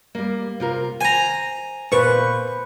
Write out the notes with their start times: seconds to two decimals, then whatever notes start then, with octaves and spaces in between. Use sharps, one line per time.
0.15 G3 A#3
0.60 C3 F4 A#4
1.01 C5 G#5 A#5
1.92 A#2 B4 C5 C#6